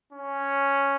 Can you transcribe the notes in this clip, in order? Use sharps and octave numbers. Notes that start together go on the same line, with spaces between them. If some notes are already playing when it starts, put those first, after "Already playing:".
C#4